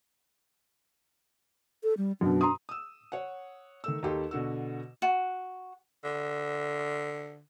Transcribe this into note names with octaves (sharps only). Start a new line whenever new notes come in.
A4
G3
F#2 B2 D4
A#5 C6 D#6
D#6 E6
C#5 F#5
D#3 A3 E6
D#2 D#4 G4 A4 C6
B2 D3 F#4 E6
F#4
D3